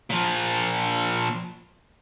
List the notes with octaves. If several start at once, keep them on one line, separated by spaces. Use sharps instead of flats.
A#2 F3